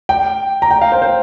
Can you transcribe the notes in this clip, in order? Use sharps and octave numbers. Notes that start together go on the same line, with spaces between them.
G5
A#5
G5
F5
C5
C5